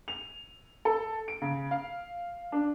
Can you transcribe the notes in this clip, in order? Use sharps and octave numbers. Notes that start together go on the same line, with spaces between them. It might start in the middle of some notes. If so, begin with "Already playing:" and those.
F7
A4
D7
C#3
F5
D4